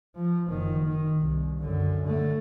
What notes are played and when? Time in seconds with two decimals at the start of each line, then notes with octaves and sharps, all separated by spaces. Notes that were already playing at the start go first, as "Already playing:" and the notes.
0.16 F3
0.48 F#1 D#3
0.86 D#3
1.20 C2
1.60 F#2 D3
2.05 D3 A3